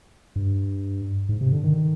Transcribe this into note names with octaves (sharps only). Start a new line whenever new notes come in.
G2
G#2
C3
D3
D#3